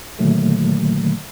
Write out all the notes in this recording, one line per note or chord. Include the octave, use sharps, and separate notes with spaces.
A#2 D3 D#3 F#3 A3 A#3